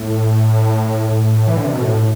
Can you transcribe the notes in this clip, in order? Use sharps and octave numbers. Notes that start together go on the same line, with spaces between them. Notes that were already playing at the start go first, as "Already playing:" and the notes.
Already playing: A2
A2
E3
D3
C3
B2
A2